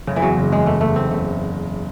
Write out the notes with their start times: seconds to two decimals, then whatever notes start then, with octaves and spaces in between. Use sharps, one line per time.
0.07 F#1 C#3
0.16 E3
0.22 E2 F#3
0.36 F#1
0.51 E2 G#3
0.66 F#1 A3
0.81 F#1 A3
0.96 F#1 C4
1.10 F#1 A3